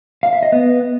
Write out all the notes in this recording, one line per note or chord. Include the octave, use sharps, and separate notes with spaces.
F5
E5
D#5
B3